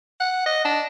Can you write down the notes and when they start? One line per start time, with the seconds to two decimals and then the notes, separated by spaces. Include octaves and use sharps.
0.20 F#5
0.46 D#5
0.65 D4